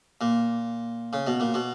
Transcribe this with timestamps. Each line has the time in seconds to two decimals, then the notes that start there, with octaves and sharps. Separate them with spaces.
0.21 A#2
1.13 C#3
1.27 B2
1.40 A#2
1.54 B2